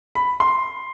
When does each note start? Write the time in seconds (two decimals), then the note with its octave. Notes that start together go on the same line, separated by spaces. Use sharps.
0.15 B5
0.40 C6